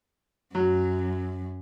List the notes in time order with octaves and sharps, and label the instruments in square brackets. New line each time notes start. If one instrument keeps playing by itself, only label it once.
[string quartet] F#2 [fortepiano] F#3